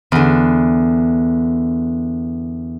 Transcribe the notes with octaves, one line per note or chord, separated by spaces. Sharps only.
E2 D3